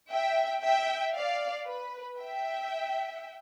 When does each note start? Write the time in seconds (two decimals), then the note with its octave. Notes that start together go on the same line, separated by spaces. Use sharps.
0.12 E5 G5
0.63 E5 G5
1.15 D5 F5
1.67 B4
2.19 E5 G5